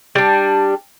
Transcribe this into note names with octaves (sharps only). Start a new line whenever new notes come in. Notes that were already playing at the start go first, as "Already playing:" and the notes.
G3 D4